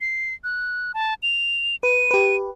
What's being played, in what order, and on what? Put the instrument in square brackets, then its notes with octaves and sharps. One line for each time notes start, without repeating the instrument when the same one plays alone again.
[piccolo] C7
F#6
A5
F7
[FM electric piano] B4 [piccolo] D#7
[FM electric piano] G4 B4